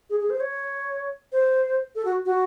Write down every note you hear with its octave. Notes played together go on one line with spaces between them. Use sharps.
G#4
G#4
C5
C#5
C5
A4
F#4
F#4